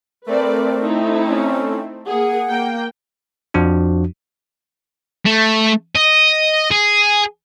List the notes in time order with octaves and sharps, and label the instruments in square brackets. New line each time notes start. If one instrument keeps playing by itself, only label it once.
[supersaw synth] A3 C4 [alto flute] A#4 [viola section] B4 D5
[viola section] D#4 E4
[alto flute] C#4
[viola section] A#3 G#4 [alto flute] F#5
[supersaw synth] A#3 [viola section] G5
[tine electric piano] F2 F3 D4 F#4
[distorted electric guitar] A3
D#5
G#4